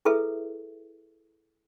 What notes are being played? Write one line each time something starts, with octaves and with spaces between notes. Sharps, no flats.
E4 G#4 A4 B4 E5